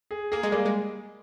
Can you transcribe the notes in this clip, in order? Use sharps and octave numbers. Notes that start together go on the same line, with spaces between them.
G#4
A#3 G#4
G#3
G3 A#3
G#3